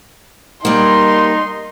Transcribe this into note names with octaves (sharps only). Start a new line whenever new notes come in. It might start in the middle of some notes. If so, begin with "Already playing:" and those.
G3 A#3 D#4 C6